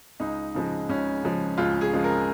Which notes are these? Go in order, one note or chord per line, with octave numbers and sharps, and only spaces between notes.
C#2 D#4
C#3 F3 G#3
C#2 C#4
C#3 F3 G#3
C#2 F4
G#4
C#3 F3 G#3
A#4